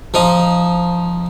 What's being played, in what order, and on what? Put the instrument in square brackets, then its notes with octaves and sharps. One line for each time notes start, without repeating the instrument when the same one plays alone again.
[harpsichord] F3 D#4